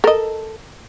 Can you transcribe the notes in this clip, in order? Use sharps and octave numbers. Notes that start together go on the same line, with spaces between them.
A4 A#4 D#5